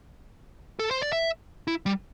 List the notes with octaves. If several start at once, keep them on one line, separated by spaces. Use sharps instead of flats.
A4
C5
D5
E5
E4
G3